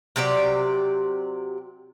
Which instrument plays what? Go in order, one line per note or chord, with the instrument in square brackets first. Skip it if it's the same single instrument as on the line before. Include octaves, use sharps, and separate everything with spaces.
[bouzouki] C3 F#3 G4 D5